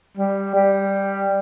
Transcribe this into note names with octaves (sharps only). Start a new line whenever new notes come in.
G3
G3